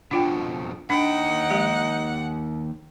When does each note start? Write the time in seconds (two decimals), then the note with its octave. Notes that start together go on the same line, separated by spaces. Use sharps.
0.11 F2 B2 D4 F4 G5
0.90 D#2 D4 D#4 F#5 G5
1.50 F3 G#3 G4